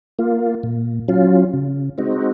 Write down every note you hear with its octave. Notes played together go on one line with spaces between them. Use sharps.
A#3 F4
A#2
F#3 C#4 F4
C#3
G#3 C4 D#4 F#4